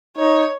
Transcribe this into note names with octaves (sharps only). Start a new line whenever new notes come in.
D#4 C#5